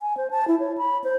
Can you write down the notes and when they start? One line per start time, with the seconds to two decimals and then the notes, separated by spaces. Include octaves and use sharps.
0.01 G#5
0.17 C5
0.31 A5
0.48 E4
0.60 C#5
0.78 B5
1.04 C5